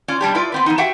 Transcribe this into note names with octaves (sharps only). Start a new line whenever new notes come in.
C#4 F4 D5
B2 G3 D4 G4
E4 F4 B4 D5
B3 C4 B4
E3 B3 D#4
F#4 G4 E5 F#5 G5